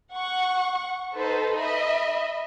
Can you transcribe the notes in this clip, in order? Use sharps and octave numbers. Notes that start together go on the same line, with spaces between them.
F#5 C#6
D#4 A4 B4 C5
D#5 E5 B5